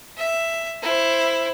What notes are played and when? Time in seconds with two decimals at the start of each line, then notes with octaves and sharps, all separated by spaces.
0.18 E5
0.82 E4 C5